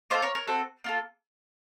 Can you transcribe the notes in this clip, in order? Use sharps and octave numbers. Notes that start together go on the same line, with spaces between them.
A#3 F4 A4 C5 D#5
A#4 C#5
A#4 C#5
C4 F#4 A4
A#3 F4 A4